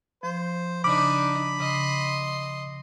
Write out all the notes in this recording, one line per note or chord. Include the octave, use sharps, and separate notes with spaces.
F3 C5
C#3 D4 D#4 B5 D6
C#3 D#5 C6